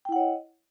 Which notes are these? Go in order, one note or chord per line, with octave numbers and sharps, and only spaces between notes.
E4 C#5 D#5 F#5 G5